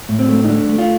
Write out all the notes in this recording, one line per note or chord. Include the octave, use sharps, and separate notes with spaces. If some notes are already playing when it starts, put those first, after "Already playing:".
A2
C4
A3
D#4
A3 D4
A3
F4